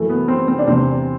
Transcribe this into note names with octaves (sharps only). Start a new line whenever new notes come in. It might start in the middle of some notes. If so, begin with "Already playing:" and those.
Already playing: F#2 E3 A3
B3
C4
C4
D4
E2 C3 E3 C4